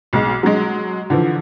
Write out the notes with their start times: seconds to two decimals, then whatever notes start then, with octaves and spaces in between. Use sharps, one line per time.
0.13 B1 G#3
0.43 F#3 G#3
1.10 D3 E3 F3